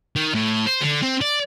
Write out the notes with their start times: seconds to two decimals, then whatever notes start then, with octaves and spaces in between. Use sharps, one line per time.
0.16 D#3
0.35 A2
0.67 C5
0.82 D3
1.02 C4
1.21 D5